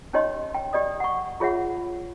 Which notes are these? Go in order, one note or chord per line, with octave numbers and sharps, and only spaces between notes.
C#4 D#4 G4 C#5 D#5 C6
G5
G4 D5 D#5 D#6
F#5 C#6
F4 G#4 C#5 E5 F#5